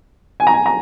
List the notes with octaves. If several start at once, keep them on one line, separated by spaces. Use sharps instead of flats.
G#5
A#5
G#5
A#5